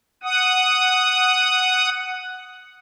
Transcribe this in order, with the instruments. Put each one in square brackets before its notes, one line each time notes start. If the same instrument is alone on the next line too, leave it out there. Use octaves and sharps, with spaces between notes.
[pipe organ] F#5 D#6